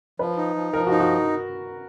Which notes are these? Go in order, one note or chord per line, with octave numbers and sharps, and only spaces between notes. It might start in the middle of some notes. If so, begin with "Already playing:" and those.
F3 B4
D#4
F3
F3 A#4
D#4 F#4
F#4